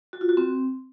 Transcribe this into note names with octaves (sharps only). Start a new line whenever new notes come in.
F#4
F4
F#4
C4